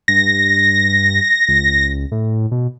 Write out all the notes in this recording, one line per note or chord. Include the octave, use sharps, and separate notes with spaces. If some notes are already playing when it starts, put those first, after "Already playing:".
G2 A#6
C#2
A2
B2